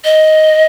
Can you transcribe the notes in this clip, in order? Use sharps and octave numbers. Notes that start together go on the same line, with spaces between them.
D#5